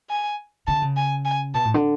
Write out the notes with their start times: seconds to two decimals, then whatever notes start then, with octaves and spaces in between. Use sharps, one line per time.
0.10 G#5
0.67 D3 A5
0.82 C#3
0.96 G#5
1.25 G#5
1.54 B2 A5
1.65 A2
1.74 D3